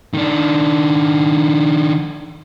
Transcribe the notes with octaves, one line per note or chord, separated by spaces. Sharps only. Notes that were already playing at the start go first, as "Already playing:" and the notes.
D#3 D4